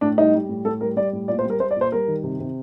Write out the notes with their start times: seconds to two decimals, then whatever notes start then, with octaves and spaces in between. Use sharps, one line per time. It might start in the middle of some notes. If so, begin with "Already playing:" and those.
0.01 A2 D4
0.18 G3 D#4
0.34 G3
0.49 A2
0.65 A2 A4
0.81 G3 A#4
0.97 G3 D5
1.13 A2
1.28 A#2 D5
1.39 C5
1.45 G3
1.50 A#4
1.60 G3 C5
1.71 D5
1.76 A#2 C5
1.92 G3 A#4
2.08 D#3
2.24 C3
2.40 C3